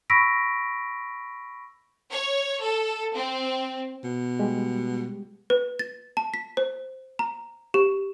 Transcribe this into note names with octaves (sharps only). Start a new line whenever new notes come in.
B5 C#6 E6 A#6 B6 D7
C#5
A4
C4
B2
G3 G#3 G4
B4
A6
A5
B6
C5
A#5
G4